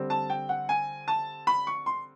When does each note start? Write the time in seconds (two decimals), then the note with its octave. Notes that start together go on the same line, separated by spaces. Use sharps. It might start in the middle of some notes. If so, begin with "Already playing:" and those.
Already playing: D3 G3 C4
0.10 A5
0.30 G5
0.49 F#5
0.69 G#5
1.08 A5
1.47 B5
1.67 C#6
1.86 C6